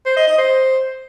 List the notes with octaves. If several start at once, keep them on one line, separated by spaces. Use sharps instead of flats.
C5
D#5
D#5
C5